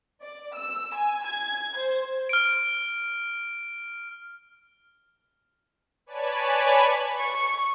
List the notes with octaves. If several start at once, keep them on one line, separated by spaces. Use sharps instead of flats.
D5
E6
G#5
G#6
C5
F6 D7
B4 C#5 D5 G#5 A5 B5
C#6